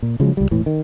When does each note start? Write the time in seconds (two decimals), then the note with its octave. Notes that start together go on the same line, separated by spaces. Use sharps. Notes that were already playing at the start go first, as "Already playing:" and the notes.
0.02 A#2
0.20 C#3 F3 F#3 G#3
0.37 C#2 G3
0.51 E1 A2 E3
0.66 D#3